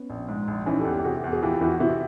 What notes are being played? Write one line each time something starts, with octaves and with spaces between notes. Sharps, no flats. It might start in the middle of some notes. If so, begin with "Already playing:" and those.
Already playing: B3 C#4
A#1
G#2
A#1
E3 C#4 D#4
G4 A4
E2
G4 A4
C3 F#4 G#4
E2
F#4 G#4
E3 F4 G4
E2 E4 F#4
C3 E4 F#4